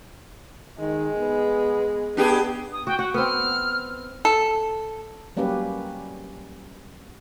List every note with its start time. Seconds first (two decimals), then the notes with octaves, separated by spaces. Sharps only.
0.79 D#3 G#3
1.17 B3
2.17 B3 D4 G4 G#4
2.72 D#6
2.87 F#4 G5
2.99 F#4 F#5
3.14 B3 C4 F6
4.25 A4
5.37 F#3 G3 A#3 C#4 G4 B4